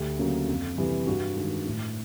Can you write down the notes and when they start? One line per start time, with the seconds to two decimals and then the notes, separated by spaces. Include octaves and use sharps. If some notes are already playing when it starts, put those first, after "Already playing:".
Already playing: D2 G4
0.19 C#3 F#3 A#3
0.48 F2
0.78 C3 E3 G3
1.07 G2 F#4
1.36 D#3 G#3
1.66 A2